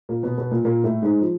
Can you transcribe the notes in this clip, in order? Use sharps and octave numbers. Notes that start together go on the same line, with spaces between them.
A#2 A#3
B2 B3
B2 B3
A#2 A#3
A#2 A#3
A2 A3
G#2 G#3
F3